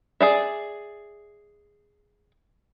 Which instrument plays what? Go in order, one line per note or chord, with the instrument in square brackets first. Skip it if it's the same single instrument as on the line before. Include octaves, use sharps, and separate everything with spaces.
[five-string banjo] G#4 D5 E5